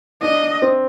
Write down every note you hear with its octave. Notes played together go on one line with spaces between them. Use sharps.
D4 D#5
C4